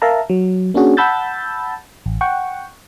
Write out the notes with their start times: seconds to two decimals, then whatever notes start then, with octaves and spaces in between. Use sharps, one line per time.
0.02 A#4 E5 F5 A5 A#5
0.30 F#3
0.74 A#3 C#4 D4 F#4 G#4
0.97 F#5 A5 B5 E6 G6 A6
2.06 A1
2.21 F#5 G5 C#6